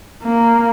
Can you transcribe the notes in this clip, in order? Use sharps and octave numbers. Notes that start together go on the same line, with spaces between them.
A#3